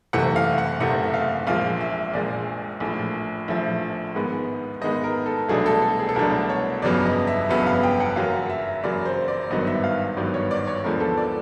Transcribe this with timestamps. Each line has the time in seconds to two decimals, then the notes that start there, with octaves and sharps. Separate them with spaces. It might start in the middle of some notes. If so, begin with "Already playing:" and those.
0.13 F#1 E2 C3 E3 A3 F#5
0.36 F5
0.58 F#5
0.80 F#1 E2 C3 E3 A3 F#5
1.07 E5
1.14 F5
1.47 A#1 A#2 F3 G#3 F5
1.81 E5
2.13 A#1 A#2 F3 G#3 D5
2.80 A#1 A2 F3
3.48 A#1 A2 F3 E5
4.15 G#2 D#3 G#3 B3
4.81 G#2 D#3 G#3 B3 D#5
5.04 A#4
5.26 A4
5.49 C2 B2 F#3 A3 D4 G#4
5.66 A4
5.82 A4
5.99 G#4
6.09 A4
6.15 C2 B2 F#3 A3 D4 A#4
6.49 C#5
6.82 G1 F2 C#3 F#3 B3 D5
7.05 D#5
7.27 E5
7.49 G1 F2 C#3 F#3 B3 E5
7.67 F5
7.83 G5
8.00 F#5
8.16 F#2 C#3 F#3 A#3 F5
8.50 E5
8.83 F#2 C#3 F#3 A#3 D5
9.05 C5
9.28 D5
9.50 G#1 G2 D#3 F#3 B3 D#5
9.67 E5
9.84 F5
10.17 G#1 G2 D#3 F#3 B3 D5
10.34 C#5
10.51 D5
10.67 C#5
10.84 D#2 D3 F3 G#3 B3 A#4
11.00 A4
11.18 D5